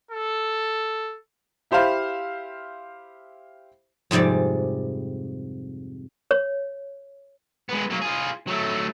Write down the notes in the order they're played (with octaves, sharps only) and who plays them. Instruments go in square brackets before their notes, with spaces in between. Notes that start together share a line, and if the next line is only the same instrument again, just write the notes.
[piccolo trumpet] A4
[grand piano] E4 G4 C5 E5 F5 B5
[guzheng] F2 G#2 C3 G3 D5
[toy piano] C#5
[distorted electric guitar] G#3 B3
F#3 A#3
F4 G#4
F#3 A3